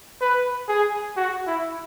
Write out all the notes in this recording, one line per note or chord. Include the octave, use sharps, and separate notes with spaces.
B4
G#4
F#4
E4